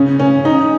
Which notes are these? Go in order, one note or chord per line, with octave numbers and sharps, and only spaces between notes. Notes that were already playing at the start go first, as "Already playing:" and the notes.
Already playing: C#3 C#4
C#4
D#4